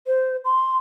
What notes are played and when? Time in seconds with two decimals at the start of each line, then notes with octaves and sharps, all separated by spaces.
0.07 C5
0.45 C6